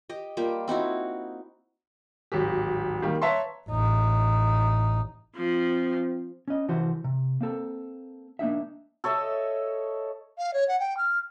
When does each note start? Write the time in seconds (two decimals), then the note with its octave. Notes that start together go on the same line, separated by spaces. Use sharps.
0.09 G4 D#5
0.37 G3 A#3 F4 G4
0.68 C4 D#4 E4 F#4
2.32 D1 G#1 F#4 G4
3.02 D#3 G3 A#3 G4
3.22 B4 C#5 E5 A5 A#5 C6
3.69 A1 D#4
5.36 F3 C4
6.48 C#4 D#5
6.68 C2 E3 F#4 C5
7.04 C3
7.41 A#3 C4 A4
8.39 A#3 D4 D#4 E5
9.04 A4 C#5 D#5 E5
10.38 F5
10.54 C#5
10.68 F#5
10.79 G5
10.97 F6